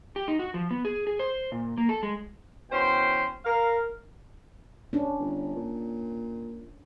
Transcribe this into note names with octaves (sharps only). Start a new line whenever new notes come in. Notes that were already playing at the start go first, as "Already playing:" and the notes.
G4
D#4
F#4
F3
B3
G#4
G#4
C5
A#2
A#3
A4
G#3
B2 E3 C#4 C5 G5 C6
A#4 F5
C#4 D4
G1
A#2